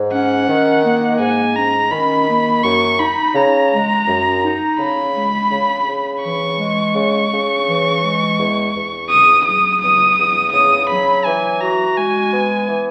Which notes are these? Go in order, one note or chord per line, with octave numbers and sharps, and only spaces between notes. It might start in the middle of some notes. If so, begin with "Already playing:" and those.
Already playing: G#2
C#4 F#5
D#3
A#3
G#2 G#5
C#4 A#5
D#3 B5
A#3
F#2 C#6
D#4 B5
C#3 A#5
G#3
F#2
D#4
C#3 B5
G#3
C#3
C#3
E3 C#6
G#3
C#3
C#3
E3
G#3
E2
E2
C#3 D#6
F#3 D#6
E2 D#6
E2
C#3 D#6
F#3 B5
E3 G#5
F#4 A#5
G#3 G#5
B3
E3